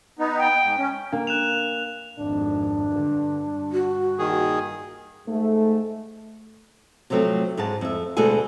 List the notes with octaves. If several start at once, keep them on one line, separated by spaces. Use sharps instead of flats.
B3 D#4
G5
G#2
C#4
A#3 D4
F#6 E7 F7
G#1 F2 D4
G2 D3
G2
F#4
A#2 D#3 G#4
G#2 A3
C3 F3 F#3 A3 C4
G#2 G#3 G#4 A5
F2 E5
D2 B2 G#3 G#4 A4 G#5